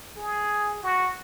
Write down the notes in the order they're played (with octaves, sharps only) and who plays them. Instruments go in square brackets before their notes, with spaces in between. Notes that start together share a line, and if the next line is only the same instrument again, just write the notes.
[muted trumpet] G#4
F#4